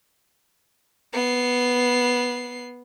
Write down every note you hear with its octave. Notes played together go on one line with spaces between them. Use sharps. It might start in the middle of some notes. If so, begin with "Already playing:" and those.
B3 C7